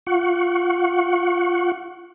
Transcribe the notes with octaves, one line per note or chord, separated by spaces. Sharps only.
F4 F#5 C#6